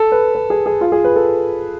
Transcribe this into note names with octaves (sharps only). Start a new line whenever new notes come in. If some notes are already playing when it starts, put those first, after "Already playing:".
Already playing: A4
B4
B4
G#4
G#4
F4
G#4
B4
A4